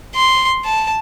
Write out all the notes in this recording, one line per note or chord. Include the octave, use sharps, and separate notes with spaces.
C6
A5